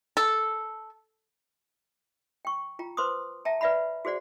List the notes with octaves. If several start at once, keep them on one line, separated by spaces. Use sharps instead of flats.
A4
G5 C#6
F4 G5 A#5
B4 C5 C6 D6 D#6
E5 G5 A5 A#5
B4 D5 E5 F#5 B5
F#4 G#4 C5 D5 F#5